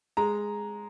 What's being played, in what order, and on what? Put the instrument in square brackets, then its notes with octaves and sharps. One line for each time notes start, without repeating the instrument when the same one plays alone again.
[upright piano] G#3 A#5